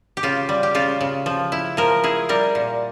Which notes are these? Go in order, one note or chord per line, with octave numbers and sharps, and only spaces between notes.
G4
C#3 F4
G3
G4
C#3 F4
C#3
F3
E4
F3 A#4
E4 G#4
G3 A#4
A#2